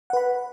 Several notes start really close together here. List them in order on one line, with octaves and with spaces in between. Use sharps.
F#5 B4 B5